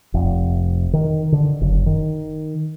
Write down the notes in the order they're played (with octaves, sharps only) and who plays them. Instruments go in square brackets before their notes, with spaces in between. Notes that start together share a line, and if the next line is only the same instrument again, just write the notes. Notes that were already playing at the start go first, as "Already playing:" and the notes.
[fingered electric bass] F1
D#3
D3
F#1
D#3